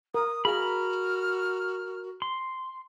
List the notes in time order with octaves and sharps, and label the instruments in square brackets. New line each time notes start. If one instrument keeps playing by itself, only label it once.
[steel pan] A#4 [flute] D#6
[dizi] F#4 [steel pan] G#4 F5 [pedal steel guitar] A#4 B5 [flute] F6
[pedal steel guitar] C6